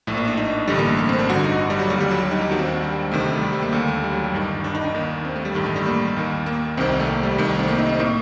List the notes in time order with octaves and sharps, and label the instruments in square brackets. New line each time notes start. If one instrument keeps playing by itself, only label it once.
[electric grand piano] A#1 A2 A3
A#3
D4
D#4
A1 G2 D3 G3
A#3
A3
A#3
C4
D4
G1 G2 D3 F#4
D#4
D#4
G3
F#3
D#2 D3 G3
G3
F#3
G3
D#4
G4
D#2 D#3 F#4
C4
D4
G3
D2 C3 D#3 A3
G3
G3
A3
A#3
D#2 D3
A3
G3
F#3
G3
G1 G2 D#3
D4
D#4
D4
D#2 D#3
C4
A3
G3
A1 G2 D#3 G3
A3
G3
A#3
D#2 D#3
A#3
C2 C3 D#3 C4
A3
A#3
G3
C2 C3 D#3 A3
C4
A#3
D#4
C4
A2 A#3